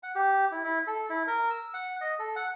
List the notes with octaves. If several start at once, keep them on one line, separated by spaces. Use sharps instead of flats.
F#5
G4
E4
E4
A4
E4
A#4
E6
F#5
D#5
A4
F#5